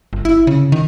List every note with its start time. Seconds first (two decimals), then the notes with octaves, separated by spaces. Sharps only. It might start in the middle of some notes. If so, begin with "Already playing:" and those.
0.13 G1
0.25 E4
0.47 C#3
0.72 D#3